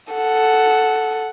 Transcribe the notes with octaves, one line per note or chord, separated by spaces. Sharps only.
A4 F#5